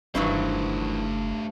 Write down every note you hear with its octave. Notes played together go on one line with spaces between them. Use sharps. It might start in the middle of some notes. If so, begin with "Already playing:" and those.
F#1 G2 D#3 E3 F#3 A3 C5 C#6